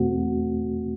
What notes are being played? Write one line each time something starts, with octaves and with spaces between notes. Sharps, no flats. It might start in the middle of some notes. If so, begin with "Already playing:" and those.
Already playing: E2 B2 A3 C4 F#4